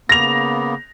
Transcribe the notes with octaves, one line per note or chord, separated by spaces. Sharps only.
C#3 A#3 B3 A#6 F7